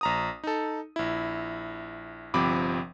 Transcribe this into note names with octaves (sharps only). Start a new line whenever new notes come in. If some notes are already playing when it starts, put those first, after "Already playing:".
A#1 A#5 D#6
D#4 A4
A#1 E4
G1 C3 F3 C4 B5 D6